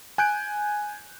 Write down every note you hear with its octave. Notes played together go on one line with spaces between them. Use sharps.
G#5 F#6 G6 D7